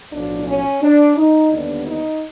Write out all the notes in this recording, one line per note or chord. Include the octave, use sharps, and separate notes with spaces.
B1 A2 F3 D4
C#4
D4
D#4
D#2 D3 G3 B3 D4
D#4